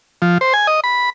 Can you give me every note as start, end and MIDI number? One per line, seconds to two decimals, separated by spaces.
0.22 0.38 53
0.41 0.53 72
0.54 0.67 80
0.67 0.80 75
0.84 1.10 83